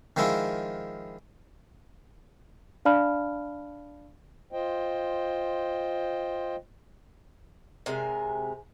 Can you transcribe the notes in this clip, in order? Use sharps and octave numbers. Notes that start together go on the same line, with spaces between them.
D#3 F3 G#3 E4 F4
D4 D5 F5 A5 B5 F6
F4 C5 D#5 G5
C3 G#3 A#4 G#5